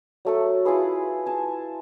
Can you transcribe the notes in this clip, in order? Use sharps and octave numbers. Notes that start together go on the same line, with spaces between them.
F#3 A3 A4
E4 F4 G#4 B4
G#5 A5